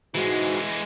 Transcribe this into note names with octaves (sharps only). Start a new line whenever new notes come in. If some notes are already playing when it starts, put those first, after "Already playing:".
G#2 E3 G#3 F#4